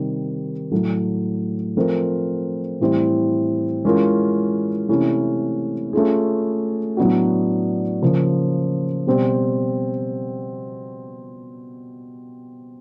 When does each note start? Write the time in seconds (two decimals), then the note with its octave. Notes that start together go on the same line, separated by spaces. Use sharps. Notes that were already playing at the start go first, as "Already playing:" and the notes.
Already playing: C3 D#3 G3
0.71 A2 F#3 A3
1.77 F3 A3 C4 F4 A#4
2.80 A2 E3 G3 C4
3.85 E3 G#3 C#4 F4 A#4
4.89 C3 E3 A3 C#4 E4
5.93 A3 C#4 F4 G#4
6.97 A2 F#3 B3 D4 F#4
8.02 C#3 F3 A#3
9.07 B2 G3 C4